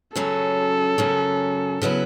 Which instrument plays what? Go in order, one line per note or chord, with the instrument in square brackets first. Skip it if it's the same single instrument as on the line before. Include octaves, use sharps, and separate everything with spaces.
[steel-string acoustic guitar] F#2 C#3 F#3 C#4 [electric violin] A4
[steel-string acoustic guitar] F#2 C#3 F#3 C#4
C#3 F#3 B3 E4